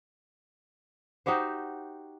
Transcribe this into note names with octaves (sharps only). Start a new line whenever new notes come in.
D#4 F#4 G4 C5